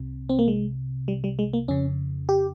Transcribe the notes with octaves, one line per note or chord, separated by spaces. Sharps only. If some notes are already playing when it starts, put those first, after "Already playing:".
Already playing: C2 C3
C4
A#3
G#3
G3
G3
G#3
A#3
F2 C#3 C#4
G4